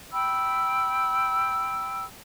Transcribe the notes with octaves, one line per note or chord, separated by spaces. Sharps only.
G5 B5 E6